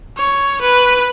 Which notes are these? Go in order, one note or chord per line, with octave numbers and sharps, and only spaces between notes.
C#5
B4